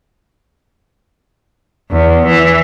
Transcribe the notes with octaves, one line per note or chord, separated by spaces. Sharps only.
E2
E3